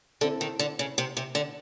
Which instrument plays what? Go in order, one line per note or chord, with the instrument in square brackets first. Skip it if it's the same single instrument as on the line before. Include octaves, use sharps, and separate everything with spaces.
[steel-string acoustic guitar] D3 [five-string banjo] C4 E4 A4
[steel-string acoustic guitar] D#3
D3
C#3
C3
C3
D3